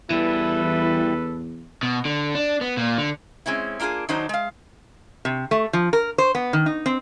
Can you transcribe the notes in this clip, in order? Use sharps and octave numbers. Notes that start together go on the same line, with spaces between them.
E2 E3 G3 E4 A4 B4
B2
D3
D4
B3
A#2
D3
G#3 C4 C#4 E4
A#3 D4 F4 G4 G#4
D#3 F#3 D4 D#4 C5
G#3 F5
C3
A3
F3
A#4
C5
B3
D#3
D#4
C4